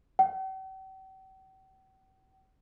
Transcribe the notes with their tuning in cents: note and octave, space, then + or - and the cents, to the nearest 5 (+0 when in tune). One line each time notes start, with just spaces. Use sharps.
G5 -45